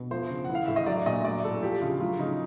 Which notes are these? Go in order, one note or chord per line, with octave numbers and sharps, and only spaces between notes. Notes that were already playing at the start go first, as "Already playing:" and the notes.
Already playing: B2
F3 C5
C#3
E3 F#5
F5
A2 E5
D#5
F#3 D5
A#2 D#5
F#3 D5
A2 A4
F3 G4
C#3 F4
F#3 F4
C#3 D#4